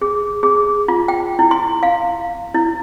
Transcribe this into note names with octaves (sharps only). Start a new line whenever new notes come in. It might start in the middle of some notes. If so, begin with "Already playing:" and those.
G#4
G#4
F4
G5
E4
C6
F5
E4